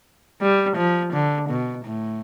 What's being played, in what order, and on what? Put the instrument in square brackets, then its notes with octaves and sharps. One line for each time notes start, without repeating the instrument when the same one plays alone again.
[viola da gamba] G3
F3
D3
B2
A2